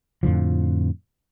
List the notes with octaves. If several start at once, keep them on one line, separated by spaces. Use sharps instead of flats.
F2 A2 D3 F3